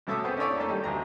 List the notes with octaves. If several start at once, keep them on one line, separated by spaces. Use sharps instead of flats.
F#2 A2 A4 E5 D6 D#6
B3 C4 G#4 A4
C#4 D4 E4 A4 C#5 D5
A3 A#3 C#4 D4 A4
D#3 G3 D#4
A1 D2 A#5